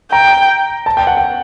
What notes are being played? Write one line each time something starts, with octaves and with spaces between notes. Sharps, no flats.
G5 A#5
A5
G5
F#5
G5